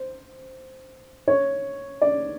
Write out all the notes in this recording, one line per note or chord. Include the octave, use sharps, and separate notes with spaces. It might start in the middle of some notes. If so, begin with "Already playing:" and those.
Already playing: C5
C#5
D5